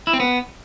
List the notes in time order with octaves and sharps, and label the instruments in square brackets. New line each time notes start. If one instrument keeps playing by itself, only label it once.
[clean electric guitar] E4
C4
B3